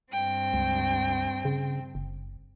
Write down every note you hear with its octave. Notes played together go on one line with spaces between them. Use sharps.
G2 C4 G5
C#2
C#3
F#1